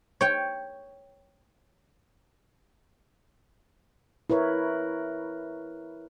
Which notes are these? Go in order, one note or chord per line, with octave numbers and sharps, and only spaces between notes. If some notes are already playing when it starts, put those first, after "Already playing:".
C#5 G5
E4 A#4 B4 C#5